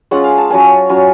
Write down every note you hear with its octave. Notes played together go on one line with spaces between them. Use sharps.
G#3 C#4 F4 F#5
F5
A5
F#3 C#4 F4 G#5
F#3 C#4 F4